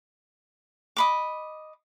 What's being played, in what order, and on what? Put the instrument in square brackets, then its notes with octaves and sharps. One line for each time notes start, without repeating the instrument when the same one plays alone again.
[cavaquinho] D#5 B5 D6